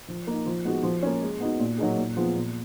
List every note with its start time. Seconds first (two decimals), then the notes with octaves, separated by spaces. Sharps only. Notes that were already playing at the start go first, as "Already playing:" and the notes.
0.08 F3
0.27 A#3 D#4
0.46 F3
0.65 G#3 B3 D#4 F#4
0.83 F3
1.03 A#3 C#4
1.22 G#3
1.40 B3 D#4 F#4
1.59 A#2
1.78 F#3 A#3 D#4 G#4
1.97 A#2
2.17 F3 B3 F4 G#4
2.35 A#2